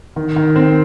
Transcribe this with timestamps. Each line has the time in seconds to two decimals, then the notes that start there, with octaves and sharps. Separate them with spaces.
0.16 D#3
0.36 D#3
0.56 C4